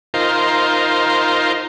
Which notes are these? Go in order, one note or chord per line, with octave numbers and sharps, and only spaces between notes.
D#4 F4 A#4 C5